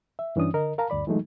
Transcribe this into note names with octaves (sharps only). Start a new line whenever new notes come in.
E5
G2 E3 C#4 D4 D#6
D3 A#4 D#5
A#4 F5 A5 A#5
D2 G2 D5 B5
E3 F#3 G#3 A3 D#4